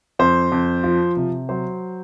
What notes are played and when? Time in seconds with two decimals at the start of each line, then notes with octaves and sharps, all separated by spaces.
0.19 F2 C5
0.52 F2
0.84 F3
1.17 C3
1.49 F#3 C5